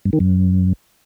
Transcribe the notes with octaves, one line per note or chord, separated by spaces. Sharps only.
G2
D#3
F#2